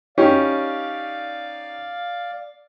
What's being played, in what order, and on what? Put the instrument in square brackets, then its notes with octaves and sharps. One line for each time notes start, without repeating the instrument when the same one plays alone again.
[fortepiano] C#4 D#4 G4 [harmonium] D5 F5